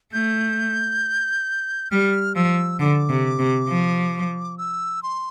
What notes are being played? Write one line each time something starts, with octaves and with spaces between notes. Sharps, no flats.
A3 G6
G3 F6
F3 E6
D3 D6
C3
C3
F3
E6
C6